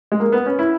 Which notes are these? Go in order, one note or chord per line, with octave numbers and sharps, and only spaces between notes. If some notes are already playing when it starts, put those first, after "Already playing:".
G#3
A#3
B3
C#4
E4